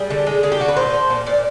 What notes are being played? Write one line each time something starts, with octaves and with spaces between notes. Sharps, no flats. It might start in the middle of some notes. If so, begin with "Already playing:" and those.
Already playing: G3 G#4
D3
G#3
D3 G#4
G4
D3 F#4
B4
A#2 C5
F3
A#2
A#2 D5